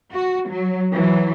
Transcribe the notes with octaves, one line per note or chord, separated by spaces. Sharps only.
F#4
F#3
E3 F#3